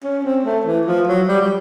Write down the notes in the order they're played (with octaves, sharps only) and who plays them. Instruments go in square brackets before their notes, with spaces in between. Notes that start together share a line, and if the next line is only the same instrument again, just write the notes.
[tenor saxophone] C#4
C4
A3
E3
F3
F#3
G3
G3